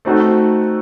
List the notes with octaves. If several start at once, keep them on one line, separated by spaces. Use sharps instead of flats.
A3 C4 D#4 F#4 A4